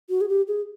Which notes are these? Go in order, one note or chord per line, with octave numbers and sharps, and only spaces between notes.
F#4
G#4
G4
G#4